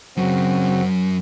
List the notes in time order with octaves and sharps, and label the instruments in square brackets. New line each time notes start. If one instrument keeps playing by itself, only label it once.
[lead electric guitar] F#2 [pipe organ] C#3 C4 F#4